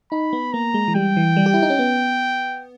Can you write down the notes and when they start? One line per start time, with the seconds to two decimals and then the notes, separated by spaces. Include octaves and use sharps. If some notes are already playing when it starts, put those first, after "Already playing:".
0.11 D#4 B5
0.33 B3
0.53 A#3 A#5
0.74 G#3
0.88 E3
0.95 G3 G5
1.17 E3
1.36 G3
1.46 G4
1.54 E4
1.62 D#4
1.70 C#4
1.79 B3